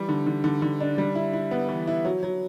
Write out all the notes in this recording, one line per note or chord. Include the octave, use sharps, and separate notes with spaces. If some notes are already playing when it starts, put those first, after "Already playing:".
Already playing: E3 G3
D3
D3
D3
D3
D4
G3
E4
E4
B3
E3
E4
F#3
F#3